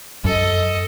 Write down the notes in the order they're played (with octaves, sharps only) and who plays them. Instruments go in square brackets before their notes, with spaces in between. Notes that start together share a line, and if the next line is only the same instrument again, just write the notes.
[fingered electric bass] F#2 [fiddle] A4 D#5